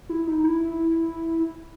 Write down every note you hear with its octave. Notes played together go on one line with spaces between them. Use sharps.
E4
D#4
E4